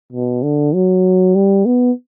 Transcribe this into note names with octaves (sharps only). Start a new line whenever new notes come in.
B2
D3
F#3
G3
B3